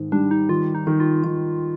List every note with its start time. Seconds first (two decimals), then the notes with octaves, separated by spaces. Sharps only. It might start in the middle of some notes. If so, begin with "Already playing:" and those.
Already playing: G#2 D#3
0.12 G3 D4
0.31 D#4
0.49 D#3 F4
0.75 D#4
0.87 D#3
1.00 F4
1.24 D#3